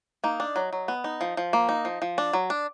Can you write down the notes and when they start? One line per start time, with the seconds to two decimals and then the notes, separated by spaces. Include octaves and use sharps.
0.24 A#3 D#4
0.40 D4
0.56 F#3
0.73 F#3
0.88 B3
1.04 D#4
1.21 F3
1.37 F3
1.53 A#3
1.69 D#4
1.85 F3
2.02 F3
2.18 D4
2.33 F#3
2.50 D4